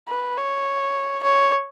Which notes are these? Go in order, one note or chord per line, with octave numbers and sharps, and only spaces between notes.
B4
C#5
C#5